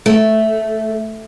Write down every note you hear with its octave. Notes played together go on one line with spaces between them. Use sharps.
A3